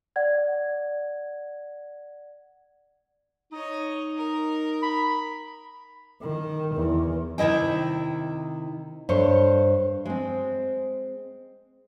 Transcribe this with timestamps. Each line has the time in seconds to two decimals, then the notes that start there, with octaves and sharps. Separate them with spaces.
0.16 D5 F#5 G#6
3.52 D#4 C#5 D#5
4.17 A#4
4.82 B5
6.21 D#3
6.75 E2
7.38 C3 D#3 E4 D#5 G5
9.09 G2 A4 C5 C#5
10.06 G#3 C4